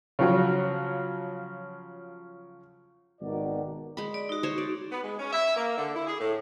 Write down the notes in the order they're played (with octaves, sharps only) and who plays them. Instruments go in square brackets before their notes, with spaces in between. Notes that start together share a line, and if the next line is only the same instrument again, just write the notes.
[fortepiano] C#3 F3 F#3
[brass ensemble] G#1 B2 D#3 F#4 D5
[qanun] G#3 B5
[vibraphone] D5
D#4 F#4
[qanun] C5 C#5
D5
[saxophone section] B3
G#3
C#4
E5
A#3
D3
E4
G#4
A2